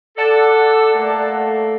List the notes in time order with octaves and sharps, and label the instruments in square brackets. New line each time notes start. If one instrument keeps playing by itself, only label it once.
[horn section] A4 [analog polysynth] D5 F#5 A5
[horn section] A3 A#3